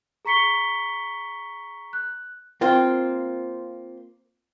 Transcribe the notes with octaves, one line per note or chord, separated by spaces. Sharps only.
G#4 A#5 C#6 B6 C#7 G7
F#6
A#3 C4 F4